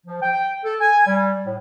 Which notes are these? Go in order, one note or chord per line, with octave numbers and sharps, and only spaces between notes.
F3
G5
A4
G#5
G3
A2